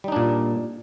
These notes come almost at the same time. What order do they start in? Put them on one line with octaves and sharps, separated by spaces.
G3 D#4 D4 A#2